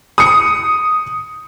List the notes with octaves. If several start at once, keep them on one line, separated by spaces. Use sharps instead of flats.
D#6 C#7